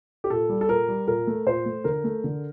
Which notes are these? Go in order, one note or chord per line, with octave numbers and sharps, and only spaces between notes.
G4
A#2 A4
G3
A4
A#2 A#4
G3
A#2 A#4
A3
A#2 C5
A3
D3 A#4
A3
D3